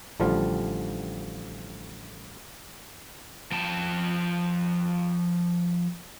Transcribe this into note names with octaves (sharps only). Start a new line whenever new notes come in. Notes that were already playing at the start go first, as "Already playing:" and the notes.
A1 D3 F3 G3 F4
F3 G5 A5